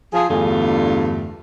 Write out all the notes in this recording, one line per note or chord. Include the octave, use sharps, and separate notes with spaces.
F3 G#4
E2 G2 D3 A3 F4